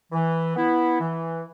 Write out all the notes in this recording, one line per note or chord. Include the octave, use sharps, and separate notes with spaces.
E3
B3 E4
E3